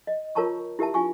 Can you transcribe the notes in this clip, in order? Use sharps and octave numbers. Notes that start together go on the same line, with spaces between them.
D#5
F4 A#4 C#5 A5 A#5 C#6
E4 G4 A#4 E5 A5
D4 F4 G#5 C#6